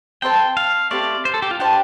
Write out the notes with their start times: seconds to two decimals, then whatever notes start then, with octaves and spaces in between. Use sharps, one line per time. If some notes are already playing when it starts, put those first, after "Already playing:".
0.22 C4 A4 C5 G5 A5
0.57 F5
0.91 A3 C4 G4 C5 D5
1.25 C5
1.34 A4
1.42 G4
1.51 F4
1.59 D4 G4 C5 A5